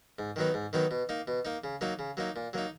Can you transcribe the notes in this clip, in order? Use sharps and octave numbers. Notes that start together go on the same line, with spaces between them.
G#2
D#3 F#3 B3 D#4
G#2
D#3 F#3 B3 D#4
B2
A#3 D#4
B2
A#3 D#4
C#3
F#3 A#3 D#4
C#3
F#3 A#3 D#4
A#2
F#3 A#3 D#4